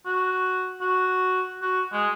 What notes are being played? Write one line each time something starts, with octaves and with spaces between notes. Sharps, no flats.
F#4
F#4
F#4
G#3